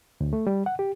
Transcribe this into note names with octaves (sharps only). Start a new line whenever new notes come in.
D2
A3
G3
F#5
G4